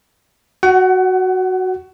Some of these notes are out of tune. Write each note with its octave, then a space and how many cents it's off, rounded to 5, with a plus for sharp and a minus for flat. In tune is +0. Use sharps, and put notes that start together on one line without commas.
F#4 +0 F#5 +30